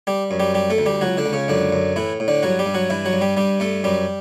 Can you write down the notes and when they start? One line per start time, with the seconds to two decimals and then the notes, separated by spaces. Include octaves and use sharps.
0.07 G3 G4
0.31 F#2
0.40 G3 G4
0.54 G3 G4
0.70 A3 A4
0.78 D2
0.86 G3 G4
1.01 C#2 F#3 F#4
1.17 D3 D4
1.26 C#2
1.33 C#3 C#4
1.48 F#2 D3 D4
1.73 F#2
1.96 A2 E3 E4
2.20 A2
2.28 D3 D4
2.43 G2 F#3 F#4
2.59 G3 G4
2.66 G2
2.74 F#3 F#4
2.90 G2 E3 E4
3.05 F#3 F#4
3.13 G2
3.21 G3 G4
3.37 G2 G3 G4
3.60 G2 A3 A4
3.84 F#2 G3 G4